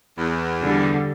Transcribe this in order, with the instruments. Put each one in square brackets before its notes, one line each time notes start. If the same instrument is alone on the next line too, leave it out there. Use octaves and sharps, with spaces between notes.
[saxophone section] E2
[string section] D3 G3